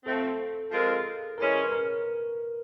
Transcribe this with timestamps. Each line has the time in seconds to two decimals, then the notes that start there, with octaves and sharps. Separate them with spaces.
0.05 F3 A3 C4 A4
0.71 F3 G#3 C4 F4 A#4
1.38 E3 G#3 C#4 A#4
1.64 B4
1.72 A#4